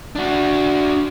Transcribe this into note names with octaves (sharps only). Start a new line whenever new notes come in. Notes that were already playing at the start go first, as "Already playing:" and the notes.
D4 F#4